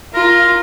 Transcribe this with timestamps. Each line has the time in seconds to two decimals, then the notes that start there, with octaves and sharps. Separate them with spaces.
0.13 F4 A#4